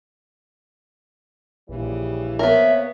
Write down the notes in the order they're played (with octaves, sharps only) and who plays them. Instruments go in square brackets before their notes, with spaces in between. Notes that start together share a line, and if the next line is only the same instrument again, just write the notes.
[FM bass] A#1 [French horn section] C#3 E3 G3
[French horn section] C3 A#3 C#5 [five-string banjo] B3 A#4 [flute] E5